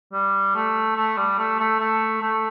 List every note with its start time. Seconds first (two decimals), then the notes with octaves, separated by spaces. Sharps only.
0.13 G3
0.55 A3
0.96 A3
1.17 G3
1.39 A3
1.60 A3
1.80 A3
2.22 A3